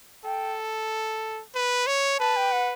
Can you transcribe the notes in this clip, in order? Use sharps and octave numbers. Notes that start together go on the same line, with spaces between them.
A4 G5
B4
C#5
B4 A5
G5
F#5